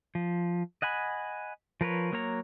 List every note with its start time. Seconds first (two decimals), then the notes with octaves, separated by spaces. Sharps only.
0.15 F3
0.82 D#5 F#5 G#5 B5
1.81 F3 A#4 B4 C#5
2.12 F#3 A#3 A#4 C#5 A#5